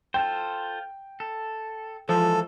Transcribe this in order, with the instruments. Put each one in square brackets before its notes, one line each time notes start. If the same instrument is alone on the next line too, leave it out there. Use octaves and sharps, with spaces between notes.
[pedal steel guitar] F4 A4 C5 [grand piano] G5
[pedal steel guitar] A4
[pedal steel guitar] E3 G#3 [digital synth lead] F3 [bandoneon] A4